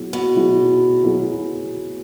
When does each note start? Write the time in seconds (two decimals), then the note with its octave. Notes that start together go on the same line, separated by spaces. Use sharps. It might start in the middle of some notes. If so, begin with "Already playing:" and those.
Already playing: F#3 B3 E4 G#4
0.13 B2
0.36 F#3 B3 E4 G#4
1.04 F#3 B3 E4 G#4